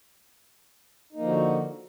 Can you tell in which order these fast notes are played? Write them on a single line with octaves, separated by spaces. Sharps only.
D#4 A#3 F3 D3 F#4